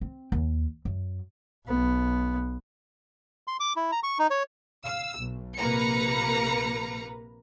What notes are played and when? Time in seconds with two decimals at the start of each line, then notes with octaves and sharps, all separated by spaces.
0.01 C4
0.32 D#2
0.85 F#2
1.67 B1 B3
3.48 C6
3.60 D6
3.76 E4
3.92 A#5
4.03 C#6
4.19 D#4
4.31 C#5
4.84 F5 E6
5.17 B1
5.56 A#1 C3 A#3 B4 A#5 C#7